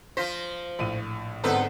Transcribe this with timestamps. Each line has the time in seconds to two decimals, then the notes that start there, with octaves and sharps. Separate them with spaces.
0.17 F3 F4 C5 A#6 B6
0.79 A#1 A2 D#7
1.44 G#2 D3 B3 C4 A4 B4